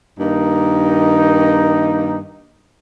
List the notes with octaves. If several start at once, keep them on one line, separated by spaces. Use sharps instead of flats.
G2 D#3 A#3 D#4